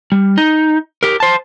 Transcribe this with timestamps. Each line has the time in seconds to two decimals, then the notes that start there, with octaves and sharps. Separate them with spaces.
0.12 G3
0.38 D#4
1.03 G4 A#4
1.20 C5 A5